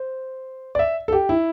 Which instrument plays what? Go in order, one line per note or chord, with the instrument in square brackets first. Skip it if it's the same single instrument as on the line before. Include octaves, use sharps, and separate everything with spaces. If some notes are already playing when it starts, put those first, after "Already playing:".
Already playing: [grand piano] C5
D5
E5
A4
G4
E4